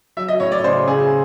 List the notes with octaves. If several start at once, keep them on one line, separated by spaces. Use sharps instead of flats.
F#3 E5
D#5
A2 C#5
D5
C#3 C5
C#3 G#4